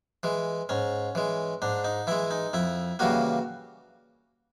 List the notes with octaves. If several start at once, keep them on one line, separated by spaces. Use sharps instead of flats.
E3 G#3
G#2 C#4
E3 G#3
G#2 D4
D#4
E3 G#3 E4
D#4
F2 E4
C#3 E3 G3 A#3 F#4